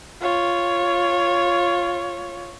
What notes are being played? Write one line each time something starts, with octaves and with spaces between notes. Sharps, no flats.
F4 C#5